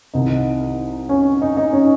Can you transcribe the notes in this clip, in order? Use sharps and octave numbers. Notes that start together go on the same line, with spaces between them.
C2 C3 D#3 D#4
C#4
D#4
D#4
C#4